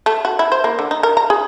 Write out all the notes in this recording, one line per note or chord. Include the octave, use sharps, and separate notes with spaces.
A3
F#4
E4
C5
A#3
D3
D#4
A#4
A#5
G#4